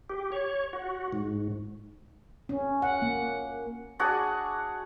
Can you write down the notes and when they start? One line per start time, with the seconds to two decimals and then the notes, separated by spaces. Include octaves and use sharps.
0.10 G4
0.32 C#5
0.73 F#4
1.13 G#2
2.49 C#4
2.82 F#5
3.02 A#3
3.99 D4 F#4 G#4 F#5